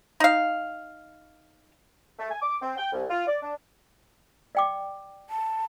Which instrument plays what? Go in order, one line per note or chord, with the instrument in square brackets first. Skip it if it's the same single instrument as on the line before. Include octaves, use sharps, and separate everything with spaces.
[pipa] D#4 F5
[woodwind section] A3
G#5
D6
C4
G5
C2
F4
D5
D4
[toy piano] D5 G5 D6
[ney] A5